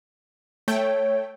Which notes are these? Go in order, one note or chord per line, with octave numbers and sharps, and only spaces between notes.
A3 C#5 G5